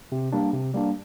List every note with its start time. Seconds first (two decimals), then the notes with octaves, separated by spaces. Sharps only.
0.12 C3
0.32 G3 A#3 D4
0.53 C3
0.74 G3 A#3 D4